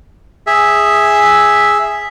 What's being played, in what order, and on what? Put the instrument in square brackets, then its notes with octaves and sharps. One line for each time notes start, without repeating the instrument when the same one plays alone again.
[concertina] G#4 E5